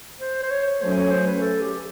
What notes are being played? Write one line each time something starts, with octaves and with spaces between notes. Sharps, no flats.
C5
C5
C#5
F#3 A3 C#4 C5
C#5
C5
B4
A4
G4